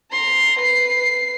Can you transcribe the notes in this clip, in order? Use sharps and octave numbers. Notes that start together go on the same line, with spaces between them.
A#5 C6
B4 C7